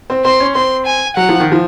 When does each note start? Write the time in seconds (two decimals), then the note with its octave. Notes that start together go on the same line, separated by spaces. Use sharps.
0.10 C4
0.25 C4 C6
0.40 C#4
0.55 C4 C6
0.86 G#5
1.17 F#3 F#5
1.29 F3
1.40 D#3
1.52 F3